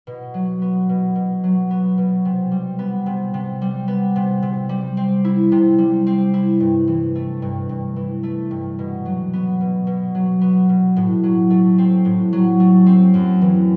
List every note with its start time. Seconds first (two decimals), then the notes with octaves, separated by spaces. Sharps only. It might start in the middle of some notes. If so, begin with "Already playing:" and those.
0.07 B2
0.34 F#3
0.62 B3
0.89 B2
1.15 B2
1.44 F#3
1.71 B3
1.98 B2
2.25 C3
2.51 G3
2.79 B3
3.06 C3
3.34 C3
3.62 G3
3.88 B3
4.16 C3
4.42 C3
4.69 G3
4.97 C4
5.25 E4
5.52 C3
5.78 G3
6.07 C4
6.34 E4
6.60 G2
6.88 E3
7.15 A3
7.42 G2
7.69 G2
7.96 E3
8.23 A3
8.51 G2
8.79 B2
9.05 F#3
9.33 B3
9.61 B2
9.87 B2
10.15 F#3
10.41 B3
10.69 B2
10.96 A2
11.23 F#3
11.50 A3
11.78 C4
12.05 A2
12.33 F#3
12.60 A3
12.86 C4
13.14 F#2
13.41 E3